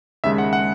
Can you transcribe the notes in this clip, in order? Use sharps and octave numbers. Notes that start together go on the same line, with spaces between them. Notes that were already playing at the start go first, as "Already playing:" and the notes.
D#2 C#3 G#3 E5
F#5
F#5